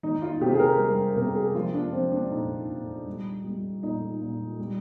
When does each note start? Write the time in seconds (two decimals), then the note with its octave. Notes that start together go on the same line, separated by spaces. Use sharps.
0.03 D#3 D#4
0.22 F4
0.41 C3 G4
0.54 G#4
0.59 A#4
0.78 G3 A#4
1.16 C3 A#4
1.35 G#4
1.55 F3 F4
1.73 D4
1.92 F3 C4
2.12 D4
2.31 A#2 D#4
2.69 A#2
3.07 G3
3.44 G3
3.82 A#2 D#4
4.21 A#2
4.59 G3